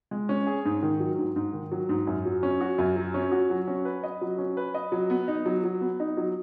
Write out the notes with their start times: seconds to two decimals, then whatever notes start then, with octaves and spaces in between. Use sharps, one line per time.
0.11 G#3
0.29 C#4
0.47 G#4
0.65 G#2
0.83 D#3
1.00 F#3
1.18 G#2
1.36 G#2
1.53 D#3
1.72 F#3
1.89 G#2
2.07 F#2
2.25 F#3
2.43 C#4
2.61 F#4
2.78 F#2
2.96 F#3
3.14 C#4
3.32 F#4
3.50 F#3
3.68 C#4
3.85 B4
4.03 D#5
4.21 F#3
4.38 C#4
4.57 B4
4.74 D#5
4.92 F#3
5.10 B3
5.28 D#4
5.46 F#3
5.64 F#3
5.81 B3
6.00 D#4
6.17 F#3